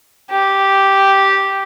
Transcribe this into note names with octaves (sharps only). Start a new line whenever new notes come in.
G4